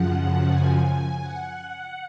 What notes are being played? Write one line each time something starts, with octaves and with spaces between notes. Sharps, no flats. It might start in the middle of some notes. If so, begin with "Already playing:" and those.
Already playing: F#2 C#3 F3 F#5
G#5
F#5